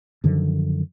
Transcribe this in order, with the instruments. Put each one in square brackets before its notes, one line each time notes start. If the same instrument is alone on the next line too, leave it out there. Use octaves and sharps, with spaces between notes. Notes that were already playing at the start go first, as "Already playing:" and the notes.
[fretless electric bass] F#2 D3 D#3 F3